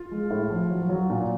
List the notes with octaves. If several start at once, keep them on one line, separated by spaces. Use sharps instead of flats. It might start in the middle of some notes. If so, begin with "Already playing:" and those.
Already playing: F4
G#3
A2
F3
F#3
F#3
A#2